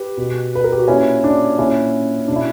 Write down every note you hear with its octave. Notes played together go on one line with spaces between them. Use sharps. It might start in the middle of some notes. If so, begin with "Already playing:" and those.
Already playing: G4 B4
B2
B4
A#4
G4
F#4
A#2 C#4 E4
D4
A#2 C#4 E4
B2 D4
E4